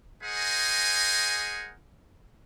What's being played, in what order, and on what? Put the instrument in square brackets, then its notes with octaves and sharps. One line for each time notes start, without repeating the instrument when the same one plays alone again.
[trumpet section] G#4 A#4 C5 D#5 F#5 G#5